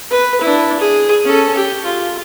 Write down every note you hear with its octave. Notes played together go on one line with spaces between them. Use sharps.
B4
D4 E4
G#4
C#4 A4
G4
F4